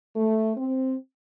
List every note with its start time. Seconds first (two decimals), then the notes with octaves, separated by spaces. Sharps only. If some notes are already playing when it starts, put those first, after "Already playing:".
0.15 A3
0.57 C4